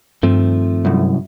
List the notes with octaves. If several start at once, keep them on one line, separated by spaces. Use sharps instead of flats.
G2 D#3 F3 A3 C4
C2 F#2